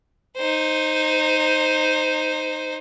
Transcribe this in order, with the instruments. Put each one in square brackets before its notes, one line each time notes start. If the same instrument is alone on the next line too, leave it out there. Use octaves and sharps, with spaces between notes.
[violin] D#4 C5